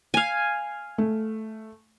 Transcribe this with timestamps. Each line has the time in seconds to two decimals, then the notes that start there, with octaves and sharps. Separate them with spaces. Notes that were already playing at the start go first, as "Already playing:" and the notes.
0.14 F5 G#5
0.98 A3